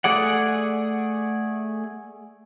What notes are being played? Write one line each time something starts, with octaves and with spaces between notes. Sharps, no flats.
A3 G#4 D5 F#5